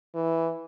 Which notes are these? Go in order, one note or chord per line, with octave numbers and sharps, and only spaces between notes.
E3